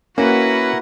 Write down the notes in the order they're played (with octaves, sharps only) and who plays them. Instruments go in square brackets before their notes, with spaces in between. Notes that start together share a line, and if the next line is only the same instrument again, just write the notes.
[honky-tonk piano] A#3 [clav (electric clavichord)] C#4 [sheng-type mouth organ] E4 A#4 F#5 [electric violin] F#4 B4